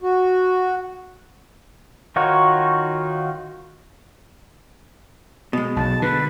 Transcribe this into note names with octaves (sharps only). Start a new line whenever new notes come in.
F#4
D#3 D#4 F4 F#4 C#5
B2 G#3
B1 A5
D3 B4